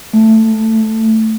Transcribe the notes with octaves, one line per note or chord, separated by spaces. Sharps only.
A3